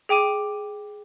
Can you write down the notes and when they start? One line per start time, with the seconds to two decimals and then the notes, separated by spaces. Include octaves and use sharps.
0.09 G#4 G5 D6 D#7